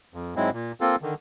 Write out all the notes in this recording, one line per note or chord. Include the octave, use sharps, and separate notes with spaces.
F2
G#2 F#3 G#3 C4 E4
A#2
A#3 C4 F4 A4
D3 D#3